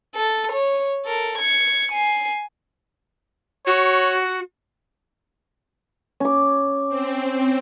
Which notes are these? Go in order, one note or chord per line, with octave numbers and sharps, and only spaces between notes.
A4
C#5
A4 A#4
G#6 C#7
G#5 C7
F#4 C#5
C#4 D6
C4